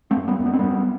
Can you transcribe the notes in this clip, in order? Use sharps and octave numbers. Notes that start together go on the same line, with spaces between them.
A3 C4
F#2
G3 B3
F#2
B3
C4
F#2 G3 B3